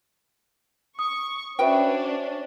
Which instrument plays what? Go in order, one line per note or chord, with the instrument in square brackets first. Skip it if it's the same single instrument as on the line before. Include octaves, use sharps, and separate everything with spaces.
[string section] C#6 [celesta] D#6
[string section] C#4 D4 [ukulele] F#4 B4 G5 [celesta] C5 E5